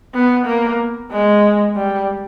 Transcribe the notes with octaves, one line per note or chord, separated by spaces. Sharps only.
B3
A#3
G#3
G3